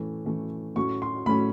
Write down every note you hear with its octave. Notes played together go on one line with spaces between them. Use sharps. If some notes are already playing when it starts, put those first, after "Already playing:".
Already playing: A2 E3 A3 C#4
A2 E3 A3 C#4
A2 F#3 A3 C#4 C#6
C6
A2 F#3 A3 C#4 B5